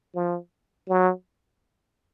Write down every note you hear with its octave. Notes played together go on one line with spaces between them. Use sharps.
F3
F#3